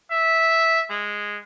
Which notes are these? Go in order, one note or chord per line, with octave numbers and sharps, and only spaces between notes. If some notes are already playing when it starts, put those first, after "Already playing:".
E5
G#3